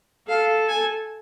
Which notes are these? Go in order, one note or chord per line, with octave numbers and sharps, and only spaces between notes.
A4 F5
G#5